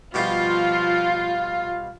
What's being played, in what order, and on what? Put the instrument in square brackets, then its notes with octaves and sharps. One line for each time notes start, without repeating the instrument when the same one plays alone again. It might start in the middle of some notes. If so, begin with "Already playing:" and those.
[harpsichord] B2 G3 G4 [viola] F3 [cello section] F4 [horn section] F5